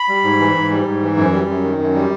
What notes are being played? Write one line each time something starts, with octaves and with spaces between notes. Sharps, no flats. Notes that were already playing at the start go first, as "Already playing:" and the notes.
Already playing: B5
G3
G#2
E3
G#2
G3
G#2
E3
F#2
G3
F#2
D#3
F#2
G3